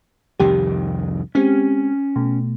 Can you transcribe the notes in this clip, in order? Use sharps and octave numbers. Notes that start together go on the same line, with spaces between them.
C2 F2 D#3 G4
G#3 C4 C#4 G4
B2 A3